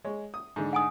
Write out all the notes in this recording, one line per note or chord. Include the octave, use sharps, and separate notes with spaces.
G#3 C#5
D#6
G#2 D3
F#5 G#5 D#6